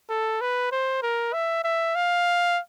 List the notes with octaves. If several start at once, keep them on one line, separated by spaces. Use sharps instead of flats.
A4
B4
C5
A#4
E5
E5
F5